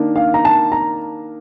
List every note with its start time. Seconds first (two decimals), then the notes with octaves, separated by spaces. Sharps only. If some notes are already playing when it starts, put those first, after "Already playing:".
Already playing: D#3 A#3 D4
0.16 F5
0.34 A#5
0.45 A5
0.72 A#5